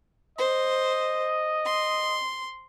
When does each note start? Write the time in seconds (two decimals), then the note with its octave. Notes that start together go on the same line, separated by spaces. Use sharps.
0.39 C5 D#5
1.66 C6